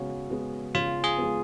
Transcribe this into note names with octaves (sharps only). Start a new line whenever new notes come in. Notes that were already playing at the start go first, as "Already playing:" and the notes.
Already playing: C#3 G#3 B3 F#4
G#3 B3
C#3 F4
G#4
G#3 B3